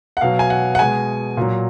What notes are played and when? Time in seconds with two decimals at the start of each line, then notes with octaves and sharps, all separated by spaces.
0.17 F#5
0.21 B2 F#3 F5
0.39 G#5
0.50 F#5
0.75 F#5
0.79 B2 G#3 G#5
1.37 A#2 F#3